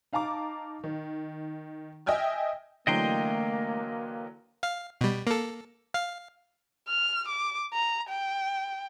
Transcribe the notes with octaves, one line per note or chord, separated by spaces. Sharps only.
D#4 F5 A5 A#5 D6
D#3
D#5 E5 G5 G#5 F6
D3 E3 F#3 A3 A#3 D#5 G5 C6
F5
B2 G3
A#3 A4
F5
F6
D6
A#5
G5